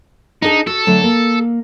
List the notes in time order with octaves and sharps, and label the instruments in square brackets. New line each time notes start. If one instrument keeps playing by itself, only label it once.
[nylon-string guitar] D4 G#4 A5 [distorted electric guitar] D#4
[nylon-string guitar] F#4 [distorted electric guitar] A4
[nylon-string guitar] D3 F#3 A3
A#3